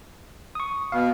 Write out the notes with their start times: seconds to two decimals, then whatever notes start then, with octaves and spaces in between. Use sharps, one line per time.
0.55 C#6 D#6
0.92 B2 F5